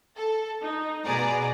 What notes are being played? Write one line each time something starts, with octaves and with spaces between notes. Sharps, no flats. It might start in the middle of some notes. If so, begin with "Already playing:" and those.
A4
D#4
B2 B3 G#4 D5 A#5